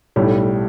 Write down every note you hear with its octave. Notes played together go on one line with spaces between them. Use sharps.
B1 A2 G3